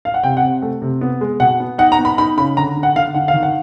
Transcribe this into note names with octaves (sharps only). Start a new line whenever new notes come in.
F5
F#5
C3 G5
F#5
C3
A3
C3
B3
G#3
B2 F#5
B3
D#4 F#5
A#5
B3
B5
D#4 B5
C#3 B5
D3 A#5
D3
F#5
D3 F5
D3 F#5
F5
D#3
F#5